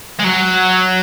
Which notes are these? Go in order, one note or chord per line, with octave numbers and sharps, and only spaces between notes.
G#3
F#3